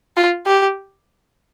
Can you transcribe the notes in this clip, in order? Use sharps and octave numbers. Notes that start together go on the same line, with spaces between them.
F4
G4